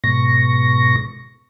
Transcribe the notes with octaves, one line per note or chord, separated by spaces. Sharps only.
G#2 B2 C#6 A#6